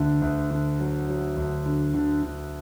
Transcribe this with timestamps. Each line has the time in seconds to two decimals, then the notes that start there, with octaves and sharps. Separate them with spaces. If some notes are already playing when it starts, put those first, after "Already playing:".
Already playing: D2 D3
0.22 D2
0.51 D3
0.80 F#3
1.08 F#3
1.37 D2
1.66 D3
1.94 D3
2.23 D3